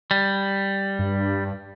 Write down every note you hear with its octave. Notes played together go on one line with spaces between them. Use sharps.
G3
G2